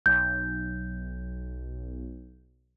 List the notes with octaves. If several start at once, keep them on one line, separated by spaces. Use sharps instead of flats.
B1 G6